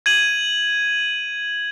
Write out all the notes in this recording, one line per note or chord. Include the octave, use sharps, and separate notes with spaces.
G#6 D#7 F#7